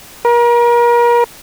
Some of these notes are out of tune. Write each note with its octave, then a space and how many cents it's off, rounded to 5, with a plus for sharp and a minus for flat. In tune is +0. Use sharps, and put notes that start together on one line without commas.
A#4 +35